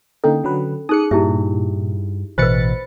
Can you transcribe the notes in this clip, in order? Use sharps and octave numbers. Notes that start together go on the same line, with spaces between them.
D3 A#3 C#4 D#4 A4
D3 F#3 B4
D#4 G#4 D#6 F#6 C#7
G2 A#2 E4 G4 E5
A1 B2 E3 B4 C5 B5 A6 C#7